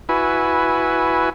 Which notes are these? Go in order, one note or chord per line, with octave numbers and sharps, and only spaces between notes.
E4 F#4 B4 G#5